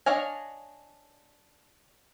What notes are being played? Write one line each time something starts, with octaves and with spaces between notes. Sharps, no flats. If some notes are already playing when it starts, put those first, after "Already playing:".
D4 C#5 D#5 F5 G#5